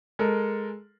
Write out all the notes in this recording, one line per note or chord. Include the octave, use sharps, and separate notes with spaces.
G#3 A4 A#4